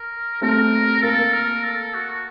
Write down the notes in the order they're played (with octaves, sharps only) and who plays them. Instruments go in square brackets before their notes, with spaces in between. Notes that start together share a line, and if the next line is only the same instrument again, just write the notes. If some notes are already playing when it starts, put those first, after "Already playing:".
Already playing: [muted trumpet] A#4
[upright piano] A3 C4 [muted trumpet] A#4
[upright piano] A#3 [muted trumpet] A4
[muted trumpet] A#4
A4
F#4